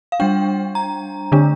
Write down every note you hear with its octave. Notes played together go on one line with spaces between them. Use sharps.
F5
G3 D4 G5
A#5
D3 A3 D4